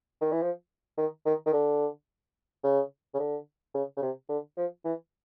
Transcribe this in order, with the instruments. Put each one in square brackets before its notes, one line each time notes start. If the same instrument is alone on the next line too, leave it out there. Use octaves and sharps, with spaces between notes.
[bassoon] D#3
E3
F3
D#3
D#3
D#3
D3
C#3
C#3
D3
C#3
C#3
C3
D3
F3
E3